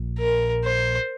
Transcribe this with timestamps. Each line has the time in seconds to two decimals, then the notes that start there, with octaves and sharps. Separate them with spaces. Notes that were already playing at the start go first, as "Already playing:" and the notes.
Already playing: A#1 A#2
0.19 A#4
0.64 C5